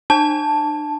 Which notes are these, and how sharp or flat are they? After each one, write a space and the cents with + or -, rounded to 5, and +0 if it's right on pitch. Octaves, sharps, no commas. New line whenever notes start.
D4 +40 A5 +0